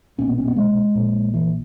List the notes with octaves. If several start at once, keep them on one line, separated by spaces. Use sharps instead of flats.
B1 A#2 C#4
B3
C#4
B3
G#3
A#1 A#2
E3